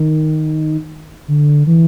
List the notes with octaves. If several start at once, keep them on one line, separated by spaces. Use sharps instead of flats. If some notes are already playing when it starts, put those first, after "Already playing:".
Already playing: D#3
D3
E3